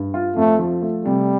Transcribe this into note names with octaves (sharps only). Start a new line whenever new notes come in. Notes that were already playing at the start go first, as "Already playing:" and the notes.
Already playing: G2
F4
F2 A3
F3
A3
C3 G3